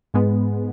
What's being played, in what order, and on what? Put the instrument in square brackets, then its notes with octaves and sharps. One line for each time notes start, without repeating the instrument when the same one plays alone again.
[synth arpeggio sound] G#2 G#3 B3